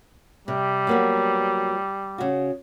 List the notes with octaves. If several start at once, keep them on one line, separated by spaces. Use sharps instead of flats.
C3 G3
F#3 A#3 B3
C#3 F#4